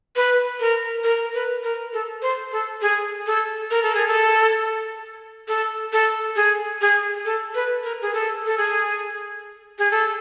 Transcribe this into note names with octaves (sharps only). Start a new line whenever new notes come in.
B4
A#4
A#4
B4
A#4
A4
C5
A4
G#4
A4
A#4
A4
G#4
A4
A4
A4
G#4
G#4
A4
B4
A#4
G#4
A4
A4
G#4
G#4
A4